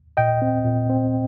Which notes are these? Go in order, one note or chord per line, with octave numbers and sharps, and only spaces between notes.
A#2 D#5 G5
C4
A#2
C4